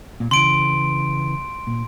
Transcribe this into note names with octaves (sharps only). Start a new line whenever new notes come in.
A#2
C#3 E3 C6 D7
A#2